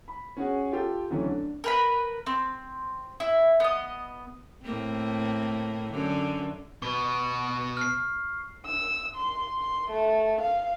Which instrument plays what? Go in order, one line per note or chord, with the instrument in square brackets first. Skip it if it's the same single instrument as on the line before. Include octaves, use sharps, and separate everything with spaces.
[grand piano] B5
C#4 F#4 G#4 F#5
F4 G4 A4
F2 D3 E3 F#3 A3 C#4
D4
[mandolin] A#4 B4 B5
C4
E4
B3 D#5
[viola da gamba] A2 A#3 C4
F#2 D3
[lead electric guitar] B2 B4 [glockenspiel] C#6
[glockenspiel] F6 C7
[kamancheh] E6
C6
C6
A3
F5